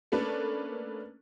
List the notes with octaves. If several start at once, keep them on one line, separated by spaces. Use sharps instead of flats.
A3 A#3 C#4 D4 A4 B4